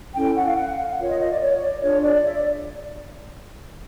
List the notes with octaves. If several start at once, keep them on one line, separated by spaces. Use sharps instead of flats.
C#4 E4 A4 G5
F#5
F5
F#5
F5
F4 A#4 C#5 E5
D#5
D#5
D5
C#5
D5
D4 F4 G#4 C#5
D5
E5
D5